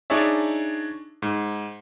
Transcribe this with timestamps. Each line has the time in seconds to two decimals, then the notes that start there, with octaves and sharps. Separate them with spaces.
0.10 D4 D#4 G#4 C#5 D5 E5
1.22 G#2